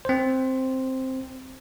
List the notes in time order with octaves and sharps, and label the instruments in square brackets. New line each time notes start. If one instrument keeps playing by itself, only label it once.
[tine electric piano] C4 C5